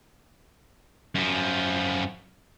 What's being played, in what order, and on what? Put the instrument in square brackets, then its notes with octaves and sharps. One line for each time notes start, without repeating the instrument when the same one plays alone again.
[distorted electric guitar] F#2 F3